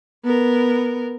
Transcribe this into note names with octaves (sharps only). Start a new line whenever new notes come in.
B3 A#4